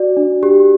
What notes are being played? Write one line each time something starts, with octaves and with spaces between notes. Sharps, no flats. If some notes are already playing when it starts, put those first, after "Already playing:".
Already playing: F#4 D5
D4
G4